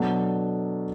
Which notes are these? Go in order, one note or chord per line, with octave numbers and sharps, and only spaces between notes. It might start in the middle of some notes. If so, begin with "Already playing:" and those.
Already playing: B2 F#3 A3 D4